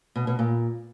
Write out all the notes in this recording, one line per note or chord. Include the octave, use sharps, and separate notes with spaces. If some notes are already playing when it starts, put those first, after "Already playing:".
B2
B2
A#2